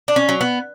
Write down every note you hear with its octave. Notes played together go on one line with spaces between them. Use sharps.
D4
C#4
F#3
B3